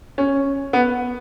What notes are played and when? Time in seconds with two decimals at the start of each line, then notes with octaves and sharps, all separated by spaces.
0.18 C#4
0.73 B3